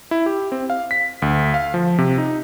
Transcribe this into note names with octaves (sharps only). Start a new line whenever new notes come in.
E4
G4
C4
F5
B6
D2
F5
F3
C3
D#4